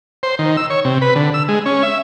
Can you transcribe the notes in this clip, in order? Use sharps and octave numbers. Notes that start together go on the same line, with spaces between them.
C5
D#3
E6
C#5
C3
B4
D3
E6
G#3
C#4
E5